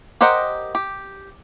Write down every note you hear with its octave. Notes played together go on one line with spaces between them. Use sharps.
G4 A#4 C5 D#5 F#5
G4